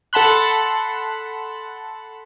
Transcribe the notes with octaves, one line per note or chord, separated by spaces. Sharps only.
A4 F#5 A5 B5 C6 F#6